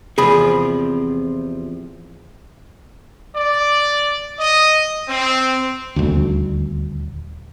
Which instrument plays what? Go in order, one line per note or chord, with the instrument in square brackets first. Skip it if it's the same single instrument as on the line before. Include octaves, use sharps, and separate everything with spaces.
[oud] E2 C3 F3 [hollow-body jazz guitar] G#4 B5
[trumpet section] D5
D#5
C4
[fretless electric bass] D#1 D2